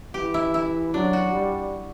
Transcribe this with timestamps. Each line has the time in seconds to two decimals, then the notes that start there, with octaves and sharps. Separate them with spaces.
0.14 E3 G4
0.34 E4
0.54 E4
0.94 F#3 D4
1.13 F#4
1.33 G3